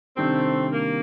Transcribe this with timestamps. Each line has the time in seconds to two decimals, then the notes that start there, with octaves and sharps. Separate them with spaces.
0.17 C3 D#3 G3 A3 C4 D4 G4
0.72 A#3